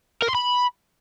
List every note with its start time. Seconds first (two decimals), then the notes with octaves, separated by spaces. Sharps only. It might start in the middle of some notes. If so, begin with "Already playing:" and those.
0.22 A#4
0.29 C6
0.35 B5